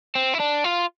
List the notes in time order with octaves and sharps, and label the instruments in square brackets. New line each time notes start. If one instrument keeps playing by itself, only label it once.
[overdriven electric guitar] C4
E4
D4
F4